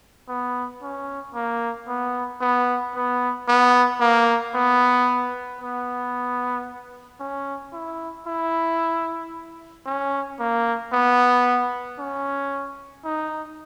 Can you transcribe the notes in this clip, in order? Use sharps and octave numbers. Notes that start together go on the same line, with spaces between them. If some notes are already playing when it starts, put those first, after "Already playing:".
B3
C#4
A#3
B3
B3
B3
B3
A#3
B3
B3
C#4
E4
E4
C#4
A#3
B3
C#4
D#4